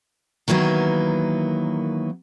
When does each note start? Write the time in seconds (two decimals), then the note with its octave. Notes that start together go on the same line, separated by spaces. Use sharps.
0.48 D#3 E3 F#3 A#3 B3